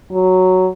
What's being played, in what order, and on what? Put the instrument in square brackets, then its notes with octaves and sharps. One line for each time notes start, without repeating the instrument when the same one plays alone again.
[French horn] F#3